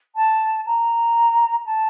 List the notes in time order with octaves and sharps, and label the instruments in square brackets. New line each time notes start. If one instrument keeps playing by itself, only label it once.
[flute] A5
A#5
A5